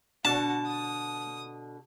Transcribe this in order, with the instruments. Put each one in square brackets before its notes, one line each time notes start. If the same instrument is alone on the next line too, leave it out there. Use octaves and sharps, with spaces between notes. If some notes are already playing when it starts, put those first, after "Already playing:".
[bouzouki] B2 D3 [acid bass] D4 [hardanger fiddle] F#4 [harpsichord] A5
[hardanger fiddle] D#6